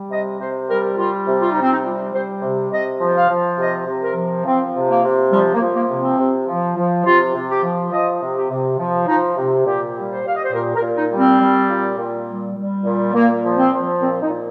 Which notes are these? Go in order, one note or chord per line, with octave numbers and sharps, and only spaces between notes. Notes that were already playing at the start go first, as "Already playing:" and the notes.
Already playing: G3
C3 D#5
C3 C5
G3 A#4
G3 F4
C3
F4
C3 D#4
C4
D#4
G3 F4
G3 C5
C3
C3 D#5
F3
F5
F3
C3 D#5
C3
A#4
F3
F3 C4
C3
A#3
C3
F3 G3
A#3
F3
A#3
C3
C4
C3
F3
F3
C3 F4
C3
G4
F3
F3 D#5
C3
G4
C3
F3
F3 D#4
C3
A#2 G4
G3
C5
G3 F5
D#5
C5
A#2 A#4
A#4
A#2
D#4
G3
C4
G3
A#2
A#2
G3
G3
A#2
A#2 A#3
F3
C4
F3
A#2 C4
D#4
A#2